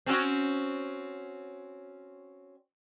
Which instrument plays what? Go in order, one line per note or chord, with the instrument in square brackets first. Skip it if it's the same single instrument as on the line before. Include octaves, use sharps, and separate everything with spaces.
[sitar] C4 C#4 F#4